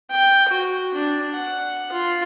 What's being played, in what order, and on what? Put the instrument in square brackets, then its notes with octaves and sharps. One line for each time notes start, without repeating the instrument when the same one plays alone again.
[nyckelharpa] G5
F#4
D4
F#5
F4